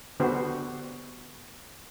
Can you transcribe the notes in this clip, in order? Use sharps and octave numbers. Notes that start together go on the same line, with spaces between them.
D3 B3 F#4 G4 C5